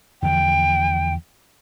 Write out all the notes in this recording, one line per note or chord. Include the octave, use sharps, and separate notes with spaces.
E2 D3 F3 G5